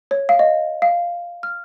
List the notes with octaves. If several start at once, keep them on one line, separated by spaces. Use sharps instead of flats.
C#5
F5
D#5
F5
F6